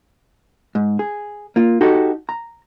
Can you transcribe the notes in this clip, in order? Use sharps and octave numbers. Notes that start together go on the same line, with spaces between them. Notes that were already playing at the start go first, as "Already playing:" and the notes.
G#2
G#4
A#3 F4
D#4 F#4 G4 A4
A#5